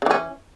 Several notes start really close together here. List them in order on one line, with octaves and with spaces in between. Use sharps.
C#3 E3 C#4